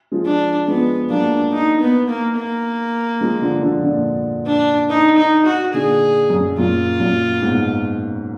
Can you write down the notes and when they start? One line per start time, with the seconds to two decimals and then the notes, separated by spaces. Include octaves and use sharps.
0.12 F3 G#3
0.26 D4
0.68 F3 G#3 B3
1.10 F#3 A#3 D4
1.53 D#4
1.81 B3
2.09 A#3
2.37 A#3
3.21 F3 G#3
3.42 D3 F3
3.63 D3 F3
3.84 A#2 D3
4.47 D4
4.89 D#4
5.17 D#4
5.45 F#4
5.73 A#2 D3 G#4
6.30 F#2
6.58 F#2 A#2 F4
7.00 F#2 A#2
7.42 G#2 B2